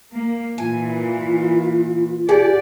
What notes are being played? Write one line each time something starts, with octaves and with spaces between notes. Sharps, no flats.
A#3
A#2 E3 F4 G#5
G4 G#4 D5 F#5